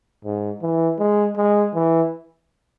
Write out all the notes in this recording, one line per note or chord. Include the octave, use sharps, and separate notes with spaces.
G#2
E3
G#3
G#3
E3